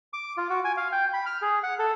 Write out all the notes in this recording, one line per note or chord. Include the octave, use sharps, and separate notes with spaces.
D6
F4
F#4
G#5
F5
G5
B5
F6
G#4
F#5
A4